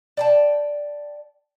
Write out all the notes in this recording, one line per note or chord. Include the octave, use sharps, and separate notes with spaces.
D5 G5 A5